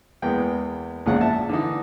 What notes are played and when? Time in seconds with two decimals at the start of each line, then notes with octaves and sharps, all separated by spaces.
0.22 E2 G#3 A#3 B3 G5
1.06 A#1 E2 G#2 C#3 F3 F#5
1.21 A#2 E5 A5
1.49 D3 E3 D#4